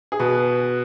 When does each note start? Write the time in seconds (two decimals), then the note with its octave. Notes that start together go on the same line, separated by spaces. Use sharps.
0.12 G#4
0.20 B2 B4